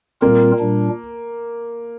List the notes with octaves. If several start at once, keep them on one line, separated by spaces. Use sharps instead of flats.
A#2 G3 A#3 C4 F4 A#4
A#2 G3 D4